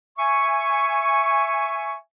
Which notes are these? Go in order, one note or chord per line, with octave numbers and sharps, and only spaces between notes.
E5 G#5 C#6